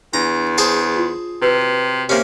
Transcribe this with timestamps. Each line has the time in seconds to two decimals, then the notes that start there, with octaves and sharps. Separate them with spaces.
0.14 E2 D4 A#5
0.58 G#4 C5 A5
0.97 F4 C6
1.42 C3 F#4 B4
2.09 C3 A#3 C#4 G4 C5 E5